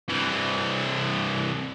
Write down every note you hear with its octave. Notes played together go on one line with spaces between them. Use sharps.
C2 E3